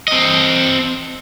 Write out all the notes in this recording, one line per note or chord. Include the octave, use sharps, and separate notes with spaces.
C4 D#5